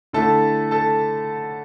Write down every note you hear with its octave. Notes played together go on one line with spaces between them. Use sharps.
D3 A3 E4 A4 A5
A4 A5